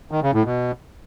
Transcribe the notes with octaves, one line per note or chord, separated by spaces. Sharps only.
D#3
C#3
A2
B2